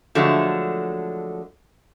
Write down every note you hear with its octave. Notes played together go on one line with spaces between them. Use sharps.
D3 F3 F#3 G#3 A3